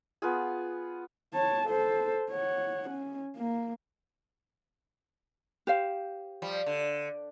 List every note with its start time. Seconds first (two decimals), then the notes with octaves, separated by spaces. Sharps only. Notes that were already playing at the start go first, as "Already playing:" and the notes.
0.22 B3 F4 G#4
1.34 C#5 A5
1.68 A4 C5
2.30 C#5 F#5
2.89 C#4
3.36 A#3
5.67 G4 C5 F5
6.42 F3 G3
6.66 D3